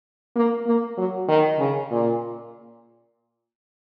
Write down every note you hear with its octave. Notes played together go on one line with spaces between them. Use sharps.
A#3
A#3
F#3
D#3
C#3
A#2